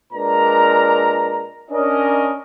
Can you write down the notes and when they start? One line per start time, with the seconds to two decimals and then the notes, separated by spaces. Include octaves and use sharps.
0.13 A#2 G#3 D4 A#4 B4 A#5
1.71 C#4 D4 A#4 D#5